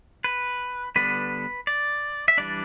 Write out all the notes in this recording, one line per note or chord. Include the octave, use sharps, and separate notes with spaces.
B4
D3 G3 B3 D4 B4
D5
E5
E3 G3 D4 D5